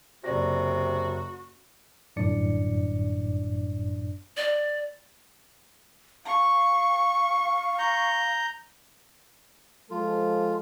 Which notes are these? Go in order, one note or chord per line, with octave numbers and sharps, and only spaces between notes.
F#1 C3 F#4 D5 A#6
G1 F#2 A2 D4 D5 C#7
D5
F5 C#6
A#5 G6
F3 G#3 F4 A4